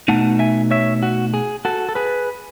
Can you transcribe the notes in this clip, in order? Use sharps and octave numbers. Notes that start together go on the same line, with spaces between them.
B2 A3 D#4 F#5 A5
E5 G#5
C#5 E5
F#4
G#4
F#4 A4
A4
G#4 B4